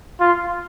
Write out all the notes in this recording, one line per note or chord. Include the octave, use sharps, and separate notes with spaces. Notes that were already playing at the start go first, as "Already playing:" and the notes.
F4